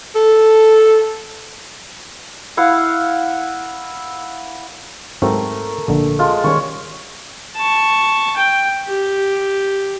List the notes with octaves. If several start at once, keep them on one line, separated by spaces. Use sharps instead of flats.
A4
E4 F5 F#5
G#2 F#3 A3 C4 A4 A#4
A#1 D3
G#3 F4 A5
D#3 G3 C#4 C#5 C#6
A5 C#6
G5
G4